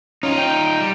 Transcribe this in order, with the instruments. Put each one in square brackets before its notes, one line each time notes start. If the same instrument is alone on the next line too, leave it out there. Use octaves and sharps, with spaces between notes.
[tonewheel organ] C#4 [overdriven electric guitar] D#4 F4
[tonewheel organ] G5
[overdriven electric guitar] G3